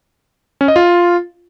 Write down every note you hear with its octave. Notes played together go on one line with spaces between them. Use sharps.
C#4
D#5
F4